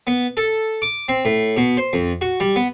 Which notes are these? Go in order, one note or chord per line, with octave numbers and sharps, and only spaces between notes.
B3
A4
D6
C4
A2
B2
C5
F2
F#4
G3
B3